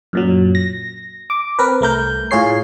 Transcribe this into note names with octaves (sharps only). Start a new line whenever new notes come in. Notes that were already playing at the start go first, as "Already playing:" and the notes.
F#2 A#2 F#3
A#6
D6
C4 A#4 B4
C2 A3 A#4 G6
A2 F4 G#4 C#5 C7